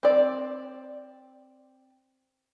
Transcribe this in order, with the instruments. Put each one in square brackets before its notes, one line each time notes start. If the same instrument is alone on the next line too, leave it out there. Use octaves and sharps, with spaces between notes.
[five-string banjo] C4 D5